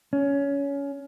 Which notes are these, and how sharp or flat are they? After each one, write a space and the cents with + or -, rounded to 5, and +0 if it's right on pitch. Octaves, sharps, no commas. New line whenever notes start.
C#4 +20